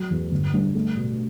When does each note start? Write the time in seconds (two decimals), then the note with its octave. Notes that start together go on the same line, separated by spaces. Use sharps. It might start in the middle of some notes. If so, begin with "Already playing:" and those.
Already playing: F#3
0.10 E2
0.32 G1
0.53 G2
0.75 A3
0.97 B2